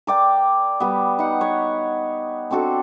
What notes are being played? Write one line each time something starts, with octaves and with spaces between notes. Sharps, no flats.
A#4 D5 G5
G3 B3
D#4 F#5
B3 C#5
C4 D4 F#4 A4